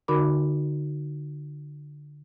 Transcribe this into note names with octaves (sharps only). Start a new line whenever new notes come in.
D3 D#4 F#4 A#4 B5 D6